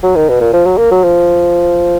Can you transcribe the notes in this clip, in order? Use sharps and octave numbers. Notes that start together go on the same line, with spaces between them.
F#3
D#3
B2
A#2
F3
F#3
A#3
F#3
F3